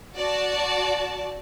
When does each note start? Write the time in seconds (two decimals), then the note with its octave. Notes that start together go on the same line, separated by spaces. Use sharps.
0.15 F#4 D5 A5